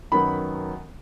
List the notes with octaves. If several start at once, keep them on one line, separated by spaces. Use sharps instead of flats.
F#2 D#3 F#3 B3 B5